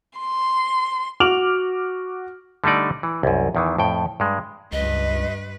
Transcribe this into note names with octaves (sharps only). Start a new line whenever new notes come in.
C6
F#4 D6 F6 D7 F7 F#7
D3 G3 A3 D#4 D5
E3
C2 F#2
E2 D#3 E3
F2 A2 G5
G2 G#3
C#2 G2 B4 D#5